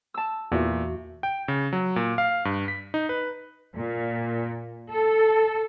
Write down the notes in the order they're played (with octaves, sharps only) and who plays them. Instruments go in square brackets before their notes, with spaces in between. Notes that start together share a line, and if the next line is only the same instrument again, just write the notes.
[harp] A5 E6
[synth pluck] E2 [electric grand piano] A#2 [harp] F#4 E5
[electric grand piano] G5
C#3
F#3
A#2
F5
G2
B6
D#4
B4
[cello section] A#2
A4